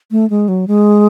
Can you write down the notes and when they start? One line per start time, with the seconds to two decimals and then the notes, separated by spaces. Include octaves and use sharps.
0.11 A3
0.30 G#3
0.48 F#3
0.68 G#3